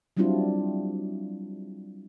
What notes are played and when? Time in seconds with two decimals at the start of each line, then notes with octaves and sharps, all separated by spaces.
0.17 F#3 G3 C4 D4 E4 F4